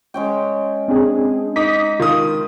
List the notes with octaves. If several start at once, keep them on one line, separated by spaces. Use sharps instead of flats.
G#3 C#4 G5
C4 D4 G#4
D#4 D6 D#6 B6
D#3 F4 D#6